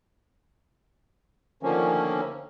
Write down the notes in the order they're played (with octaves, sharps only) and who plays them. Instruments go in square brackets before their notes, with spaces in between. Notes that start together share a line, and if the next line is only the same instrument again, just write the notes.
[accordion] D3 D#3 F3 A3 A#3 C#4